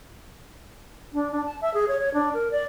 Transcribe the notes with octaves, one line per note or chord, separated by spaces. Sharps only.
D4
D4
A5
E5
G#4
C#5
C#5
D4
A#4
D5